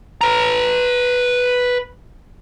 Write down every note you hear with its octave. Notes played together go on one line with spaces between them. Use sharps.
B4 A#5